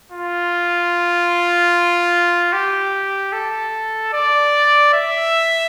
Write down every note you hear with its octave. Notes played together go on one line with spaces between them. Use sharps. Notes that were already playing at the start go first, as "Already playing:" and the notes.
F4
G4
A4
D5
E5